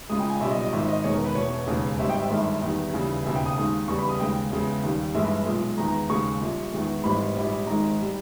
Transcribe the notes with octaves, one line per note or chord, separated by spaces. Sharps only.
C#2 C#3 G#3 D#6
G5
G#5
B1 A#2 G3 E5
D#5
D#5
G#1 G#2 D#3 E5
D#5
E1 E2 D#3 G#3 C#5
A#4
B4
E1 E2 B2 C#5
E1 D#2 C#3 G#3
G#1 G#2 G3 E5
G5
E5
G1 G2 D#3 G#3 E5
E2 D#3 G3
D#2 C#3 E3 G3
E1 D#2 C#3 E5
G5
D#6
D#2 D#3 G#3
E2 C#3 G3 C#6
B5
D#6
D#2 C#3 G#3 G5
E2 C#3 G#3
D#2 D#3 G3
G1 G2 E3 G#3 E5
B1 A#2 G#3
E2 D#3 G#3 A#5
A#5
D#2 C#3 G#3 C#6
A#1 A#2 G3
E2 D#3 G#3
G#1 G#2 E3 G3 B5
A#1 G#2 G3
G#1 G#2 D#3 G#3 A#5
G3